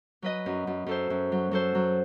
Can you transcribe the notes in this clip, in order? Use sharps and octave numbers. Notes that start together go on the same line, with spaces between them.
F#3 B4 D#5
F#2
F#2
F#2 A4 C5
F#2
F#3
F#3 A4 C5
F#3